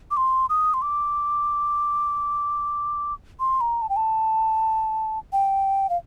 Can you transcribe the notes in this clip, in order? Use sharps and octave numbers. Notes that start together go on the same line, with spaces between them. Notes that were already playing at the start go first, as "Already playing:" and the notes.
D6
C6
D#6
C6
D6
C6
A#5
A5
G5
A5
G5
F5